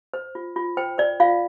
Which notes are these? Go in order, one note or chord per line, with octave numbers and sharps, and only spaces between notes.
C5
F4
F4
C5 G5
C5 D5
F4 F5